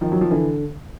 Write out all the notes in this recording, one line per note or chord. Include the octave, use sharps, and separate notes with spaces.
D#3 F3
F#3
F3
D3 E3